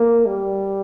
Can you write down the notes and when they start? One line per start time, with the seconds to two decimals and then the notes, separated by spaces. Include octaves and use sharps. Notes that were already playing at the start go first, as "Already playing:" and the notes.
Already playing: A#3
0.26 G3